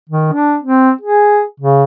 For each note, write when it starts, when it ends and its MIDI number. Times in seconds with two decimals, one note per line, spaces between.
0.10 0.29 51
0.33 0.56 62
0.62 0.91 60
1.01 1.42 68
1.60 1.84 49